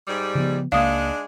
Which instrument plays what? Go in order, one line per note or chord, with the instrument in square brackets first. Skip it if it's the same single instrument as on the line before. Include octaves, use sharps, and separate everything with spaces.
[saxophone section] G#2 G3
[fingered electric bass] C#3 F3 B3
[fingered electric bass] C#2 C#3 A#3 [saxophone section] G#3 D4 D#4 [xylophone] F5 D#6